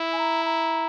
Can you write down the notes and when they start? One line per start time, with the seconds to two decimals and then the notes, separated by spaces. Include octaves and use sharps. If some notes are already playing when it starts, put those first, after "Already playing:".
Already playing: E4
0.13 G#5
0.18 A#5
0.45 A#5